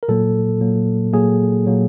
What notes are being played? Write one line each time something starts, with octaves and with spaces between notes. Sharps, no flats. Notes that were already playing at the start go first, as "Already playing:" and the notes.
A#4
A#2 F#3 A#3 A4
A#2 F#3 A#3
A#2 F#3 A#3 G#4
A#2 F#3 A#3